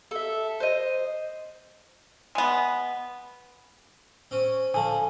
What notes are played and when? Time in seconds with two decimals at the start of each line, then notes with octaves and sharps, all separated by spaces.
0.11 A4 E5
0.60 C5 D#5
2.35 G#3 B3
4.31 C4 C#4
4.74 D3 F3 G#5 A5